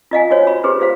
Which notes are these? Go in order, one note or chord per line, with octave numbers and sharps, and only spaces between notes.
F4 D#5 F5 G#5
F#4 C5 C#5
B5
G4 G#4 B4 C5
F4 G4 C5 F5